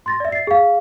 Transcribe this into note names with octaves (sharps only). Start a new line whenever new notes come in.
C6 A6 A#6
D5 E5
A6 C7
G#4 F5